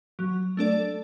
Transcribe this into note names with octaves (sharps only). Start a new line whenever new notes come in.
F#3
A3 D4 A4 D5